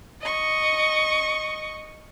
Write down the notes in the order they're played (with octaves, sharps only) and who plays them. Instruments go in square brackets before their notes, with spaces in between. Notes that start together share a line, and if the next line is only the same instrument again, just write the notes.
[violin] D#5 C#6